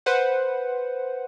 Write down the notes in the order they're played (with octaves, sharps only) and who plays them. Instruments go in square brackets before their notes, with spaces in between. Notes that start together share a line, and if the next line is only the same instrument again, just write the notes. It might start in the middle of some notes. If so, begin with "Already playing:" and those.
[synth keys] B4 C5 F#5